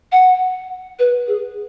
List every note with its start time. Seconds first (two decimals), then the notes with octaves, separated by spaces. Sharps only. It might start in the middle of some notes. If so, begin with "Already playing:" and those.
0.12 F#5
0.99 B4
1.28 G#4